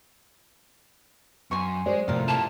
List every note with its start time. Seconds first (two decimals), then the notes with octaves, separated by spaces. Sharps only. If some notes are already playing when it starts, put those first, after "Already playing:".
1.51 F#2 G#5 C6 C#6
1.86 G#3 C5 D5
2.08 F2 A2 C3 F4 A#4
2.28 E4 G4 A5